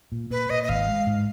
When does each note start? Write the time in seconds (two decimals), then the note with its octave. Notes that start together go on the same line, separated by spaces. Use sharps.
0.12 A#2
0.31 A#2 B4
0.50 A#2 D#5
0.64 D#5
0.69 G#1 F5
0.88 G#3
1.07 G#2